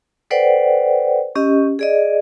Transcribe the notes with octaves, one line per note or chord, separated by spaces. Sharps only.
A4 B4 C5 D5 F#5 G5
C#4 G4 D#5
G#4 D5 D#5